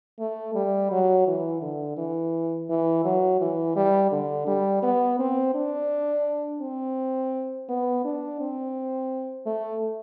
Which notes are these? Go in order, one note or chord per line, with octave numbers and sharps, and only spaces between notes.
A3
G3
F#3
E3
D3
E3
E3
F#3
E3
G3
D3
G3
B3
C4
D4
C4
B3
D4
C4
A3